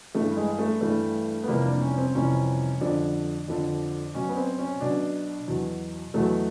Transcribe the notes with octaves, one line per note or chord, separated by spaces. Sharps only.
G2 E3 G3 A3
G#3
A3
G2 E3 G3 A3
B3
F2 C3 E3 G3 A#3
D4
C#4
C4
F2 C3 E3 G3 C#4
F2 D3 F3 D4
F2 D3 F3
B2 F#3 C#4
B3
C4
C#4
B2 F#3 D4
E2 B2 F#3
E2 B2 F#3 A3